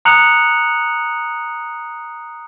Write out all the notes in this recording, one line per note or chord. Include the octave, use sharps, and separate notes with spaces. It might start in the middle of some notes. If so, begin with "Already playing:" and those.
A#5 D#6 F#6 C#7 F7 F#7